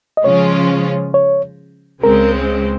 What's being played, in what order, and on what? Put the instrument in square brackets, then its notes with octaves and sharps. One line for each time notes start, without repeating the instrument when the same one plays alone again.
[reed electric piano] D#5
[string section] C#3 F3 G#3 C#4 F4 [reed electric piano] C#5
[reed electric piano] C#5
[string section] C#2 C#3 G#3 C4 [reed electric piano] A#4